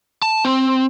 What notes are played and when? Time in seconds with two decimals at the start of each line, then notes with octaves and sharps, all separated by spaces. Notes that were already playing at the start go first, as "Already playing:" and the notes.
0.22 A5
0.45 C4